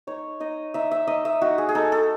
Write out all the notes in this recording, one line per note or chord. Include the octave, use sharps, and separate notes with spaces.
D#4 C#5
D#4 D#5
D#4 E5
E5
D#4 D#5
E5
D#4 F#4
G#4
G#4
D#4 A4
A4